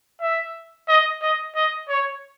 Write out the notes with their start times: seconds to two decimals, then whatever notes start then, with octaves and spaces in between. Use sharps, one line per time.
0.21 E5
0.88 D#5
1.22 D#5
1.55 D#5
1.89 C#5